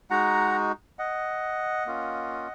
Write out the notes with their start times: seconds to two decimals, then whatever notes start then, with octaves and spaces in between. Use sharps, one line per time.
0.10 G#3 D#4 F#4 F#5 A#5
0.99 D#5 F#5
1.86 A#3 C#4 F4